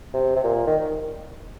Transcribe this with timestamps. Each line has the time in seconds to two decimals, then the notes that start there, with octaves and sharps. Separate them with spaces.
0.14 C3
0.36 C3
0.44 A#2
0.67 D#3